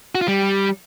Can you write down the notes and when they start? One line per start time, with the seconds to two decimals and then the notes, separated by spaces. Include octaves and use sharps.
0.15 F#4
0.21 F4
0.28 G3